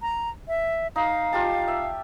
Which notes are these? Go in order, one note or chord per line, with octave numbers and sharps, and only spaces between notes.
A#5
E5
D#4 F5
F4 G4 A5
E5